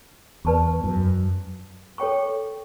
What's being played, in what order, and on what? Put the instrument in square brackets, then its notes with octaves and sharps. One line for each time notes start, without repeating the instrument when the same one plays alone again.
[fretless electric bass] E2 [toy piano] B4 D5 A5 C#6
[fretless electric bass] F#2
[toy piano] A4 C#5 G5 C#6